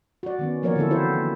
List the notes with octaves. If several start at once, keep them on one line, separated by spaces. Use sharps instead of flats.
F#4 D5
D#3 B3 C#4
F3 A#3 A#4 C#5 D5
D3 E3 A#3 C4 E4 A4
C4 E4 F#4 C5
A#3